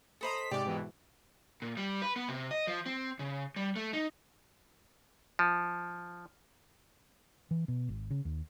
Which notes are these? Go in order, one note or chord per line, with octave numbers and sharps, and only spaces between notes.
A4 C5 D#5 A#5 B5 D#6
B6
G#2 C3 G4 D5 D6
G#2 B2 E3
A#2
G3
B4
B3
C3
D#5
F3
C4
C#3
G3
A3
D#4
F3
E3
B2
G#1
C#3
D#2